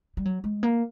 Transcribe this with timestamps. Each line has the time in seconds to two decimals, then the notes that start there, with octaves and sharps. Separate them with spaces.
0.17 G3
0.25 F#3
0.44 G#3
0.63 A#3